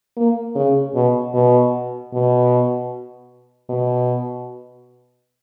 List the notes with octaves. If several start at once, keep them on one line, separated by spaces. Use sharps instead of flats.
A#3
C#3
B2
B2
B2
B2